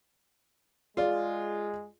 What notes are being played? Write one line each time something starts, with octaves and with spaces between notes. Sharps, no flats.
G#3 F4 G#4 D5